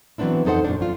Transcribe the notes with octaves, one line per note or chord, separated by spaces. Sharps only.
E3 F#3 B3 C4 D4 E4
F2 D#4 A4 C5 F#5
F#2 A#2 D4
F2 F4